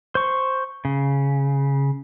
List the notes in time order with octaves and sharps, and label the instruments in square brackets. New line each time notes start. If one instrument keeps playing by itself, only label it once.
[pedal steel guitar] C5 C#6
C#3